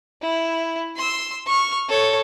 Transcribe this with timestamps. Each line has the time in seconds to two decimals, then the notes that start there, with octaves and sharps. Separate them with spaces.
0.22 E4
0.97 C6 E6
1.47 C#6 F6
1.89 A4 C#5